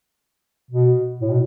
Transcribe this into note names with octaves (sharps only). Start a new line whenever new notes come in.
B2
A2
B2